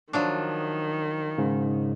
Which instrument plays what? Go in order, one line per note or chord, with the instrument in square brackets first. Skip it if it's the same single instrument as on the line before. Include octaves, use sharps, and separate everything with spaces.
[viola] D#3 [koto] F3 F#3 D4
[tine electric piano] G#2 C#3